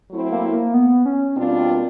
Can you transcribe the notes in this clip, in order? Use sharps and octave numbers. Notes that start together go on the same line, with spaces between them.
F#3 A3 C4 E4
A#3
A#3
B3
C#4
B2 G3 A#3 C4 D4 F4